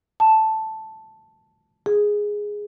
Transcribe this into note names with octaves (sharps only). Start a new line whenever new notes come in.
A5
G#4